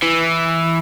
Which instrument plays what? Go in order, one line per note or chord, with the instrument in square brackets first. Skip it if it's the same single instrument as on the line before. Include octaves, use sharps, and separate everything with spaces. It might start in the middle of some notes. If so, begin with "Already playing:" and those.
[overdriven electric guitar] E3